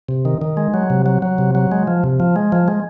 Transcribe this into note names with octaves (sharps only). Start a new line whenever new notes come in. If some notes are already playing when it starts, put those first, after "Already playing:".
C3
D#3
D#3
G#3
F#3
C3
F#3
F#3
C3
F#3
G#3
F3
C3
F3
G#3
F3
G#3